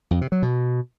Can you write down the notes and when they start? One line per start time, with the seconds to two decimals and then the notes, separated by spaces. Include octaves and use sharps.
0.11 F2
0.21 C3
0.32 F#3
0.42 B2